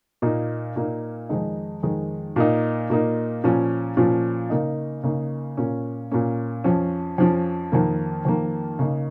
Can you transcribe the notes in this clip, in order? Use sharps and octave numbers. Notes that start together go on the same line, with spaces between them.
A#2 A#3 D#4
A#2 A#3 D#4
F2 D#3 G#3 D#4
F2 D#3 G#3 D#4
A#2 A#3 D#4
A#2 A#3 D#4
A#2 F3 C#4
A#2 F3 C#4
C#3 A#3 D#4
C#3 A#3 D#4
A#2 A#3 C#4
A#2 A#3 C#4
F2 F3 C#4
F2 F3 C#4
F2 D#3 A#3
F2 D#3 A#3
C#3 A#3 D#4